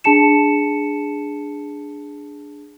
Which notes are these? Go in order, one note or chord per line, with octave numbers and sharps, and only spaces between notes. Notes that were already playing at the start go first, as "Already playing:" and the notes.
D4 G#4 A5 C#7 E7